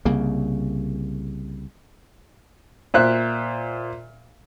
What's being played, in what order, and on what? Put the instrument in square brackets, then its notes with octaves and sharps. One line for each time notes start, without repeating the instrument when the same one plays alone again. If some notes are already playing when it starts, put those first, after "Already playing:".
[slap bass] C2 C#3 A#3
[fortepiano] A#2 C5 E5 F#6